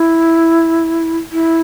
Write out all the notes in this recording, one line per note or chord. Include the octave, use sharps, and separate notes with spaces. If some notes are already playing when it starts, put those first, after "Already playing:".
Already playing: E4
E4